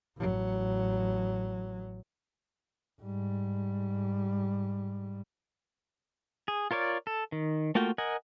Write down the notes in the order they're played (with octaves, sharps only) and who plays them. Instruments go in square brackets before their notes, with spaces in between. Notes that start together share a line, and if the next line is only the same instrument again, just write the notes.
[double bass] A1 F#3
G#2 G3
[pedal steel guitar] G#4
F4 A#4 C#5 D5
A4
D#3
A3 A#3 F4 F#4 G5
A#4 D#5 F#5 G#5